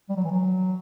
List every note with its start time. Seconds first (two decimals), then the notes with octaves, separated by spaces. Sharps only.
0.09 G3
0.16 F#3
0.24 E3
0.31 F#3